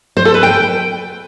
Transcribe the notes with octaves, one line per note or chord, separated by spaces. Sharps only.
C5
A4
B4
G5